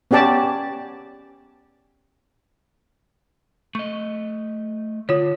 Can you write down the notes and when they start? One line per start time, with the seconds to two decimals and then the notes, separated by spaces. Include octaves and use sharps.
0.11 B3 C#4 G4 D5 A5
3.75 A3 D#5 C#6
5.09 D3 F4 C#5